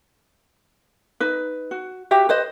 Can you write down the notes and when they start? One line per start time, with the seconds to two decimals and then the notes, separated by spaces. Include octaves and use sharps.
1.20 D#4 B4
1.71 F#4
2.11 F#4 G4 E5
2.29 B4 C5 D#5